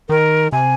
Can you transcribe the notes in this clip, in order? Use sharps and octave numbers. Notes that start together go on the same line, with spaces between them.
D#3 A#4
C3 G#5